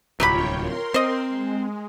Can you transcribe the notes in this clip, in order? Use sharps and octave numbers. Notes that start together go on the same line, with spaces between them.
D1 C2 F#3 F4 G4 C#5 G5 B5
A#4 C6
C4 C5 D#5
G#3